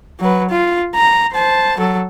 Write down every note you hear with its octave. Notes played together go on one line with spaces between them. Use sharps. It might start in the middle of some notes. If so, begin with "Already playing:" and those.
F#3 B4
F4
A#5
C5 A5
F#3 A4